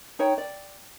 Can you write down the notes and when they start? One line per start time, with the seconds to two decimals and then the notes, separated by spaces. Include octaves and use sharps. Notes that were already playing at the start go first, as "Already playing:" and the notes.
0.19 D#4 C#5 G5
0.38 D5